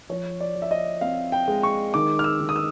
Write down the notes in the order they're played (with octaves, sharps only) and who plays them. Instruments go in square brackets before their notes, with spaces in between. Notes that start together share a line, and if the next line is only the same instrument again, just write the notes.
[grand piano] F3 C#5
D5
F3
E5
D#5
C4 F5
G5
G#3
C#6
D#3 D6
F6
E6
D#3
D#6
E6